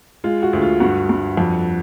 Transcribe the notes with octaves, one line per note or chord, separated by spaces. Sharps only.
G#3 F4
F#4
D2
F4
G2 F#4
G2
F2